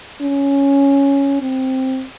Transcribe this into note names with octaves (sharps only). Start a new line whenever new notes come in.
C#4
C4